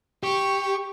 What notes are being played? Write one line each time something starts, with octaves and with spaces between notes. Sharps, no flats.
G4 C#6